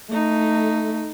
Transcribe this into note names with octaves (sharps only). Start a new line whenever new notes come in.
A3 D#4